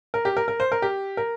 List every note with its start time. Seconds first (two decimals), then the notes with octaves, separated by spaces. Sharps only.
0.14 A#4
0.25 G4
0.37 A#4
0.48 A#4
0.60 C5
0.72 A#4
0.82 G4
1.17 A#4